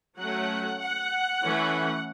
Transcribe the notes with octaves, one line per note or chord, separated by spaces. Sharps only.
F#3 A3 C#4 F#5
F#5
E3 A3 C#4